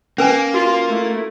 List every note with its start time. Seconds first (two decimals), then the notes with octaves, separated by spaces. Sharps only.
0.18 A#3 C#4 B4 G#5
0.54 F4 F#4
0.88 A3 E4